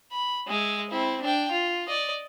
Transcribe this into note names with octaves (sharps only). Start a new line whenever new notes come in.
B5
G#3 E5
C4 E4
D4 G5
F4
D5 D#5